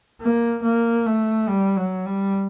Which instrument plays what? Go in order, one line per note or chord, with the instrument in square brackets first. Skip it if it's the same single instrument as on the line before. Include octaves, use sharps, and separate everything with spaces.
[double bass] A#3
A#3
A3
G3
F#3
G3